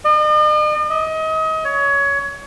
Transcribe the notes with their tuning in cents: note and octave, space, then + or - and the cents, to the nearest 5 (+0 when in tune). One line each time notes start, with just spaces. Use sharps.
D#5 -45
D#5 +30
C#5 +20